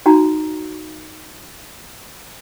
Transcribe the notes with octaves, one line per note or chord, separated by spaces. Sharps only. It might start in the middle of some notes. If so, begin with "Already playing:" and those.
D#4 F#4 A#5